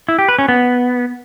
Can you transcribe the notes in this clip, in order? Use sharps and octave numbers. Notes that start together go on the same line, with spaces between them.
E4
G4
B4
C#4
B3